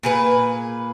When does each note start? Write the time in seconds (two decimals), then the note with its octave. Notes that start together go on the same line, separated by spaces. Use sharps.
0.03 A#2 G#4 B4